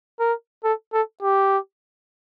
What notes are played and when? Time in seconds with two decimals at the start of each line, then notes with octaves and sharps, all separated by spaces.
0.20 A#4
0.64 A4
0.93 A4
1.23 G4